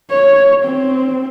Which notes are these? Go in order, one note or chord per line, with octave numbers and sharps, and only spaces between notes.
C#5
C4